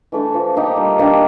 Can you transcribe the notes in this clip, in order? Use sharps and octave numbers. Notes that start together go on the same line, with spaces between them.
E3 A3 D4
F3
A#3 D#4 G4
G3
A#3 D4 G4